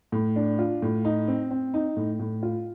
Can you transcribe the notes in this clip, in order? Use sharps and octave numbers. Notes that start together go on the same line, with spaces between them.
A2
D4
F4
A2
D#4
C4
C4
D#4
A2
A2
F4